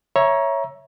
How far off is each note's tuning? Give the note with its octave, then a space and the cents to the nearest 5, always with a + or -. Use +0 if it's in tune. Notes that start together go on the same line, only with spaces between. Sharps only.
C#5 +0 E5 +5 A#5 +25